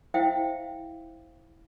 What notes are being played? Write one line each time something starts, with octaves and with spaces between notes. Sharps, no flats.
E4 C5 E5 F5 G5